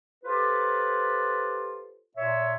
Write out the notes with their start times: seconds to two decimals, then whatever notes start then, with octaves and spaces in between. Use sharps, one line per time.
0.24 F4 G4 A4 B4 C5
2.16 A#2 C#5 E5